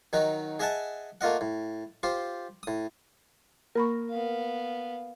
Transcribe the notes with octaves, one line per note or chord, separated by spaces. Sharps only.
D#3 F#3 D#4 F#4
G#4 D#5 E5 F#5 G#5 A5
A3 A#3 F4 D#5 F#5
A2
F4 G4 C5
A2 D#6
A#3 A#4 B5 C#6
B3 F5